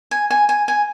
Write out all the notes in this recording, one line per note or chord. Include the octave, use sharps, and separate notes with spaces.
G#5
G#5
G#5
G#5